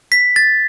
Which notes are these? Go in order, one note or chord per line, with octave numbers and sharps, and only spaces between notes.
B6
A6